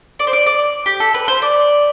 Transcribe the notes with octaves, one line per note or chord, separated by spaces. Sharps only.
D5
C5
D5
D5
G4
A4
B4
C5
D5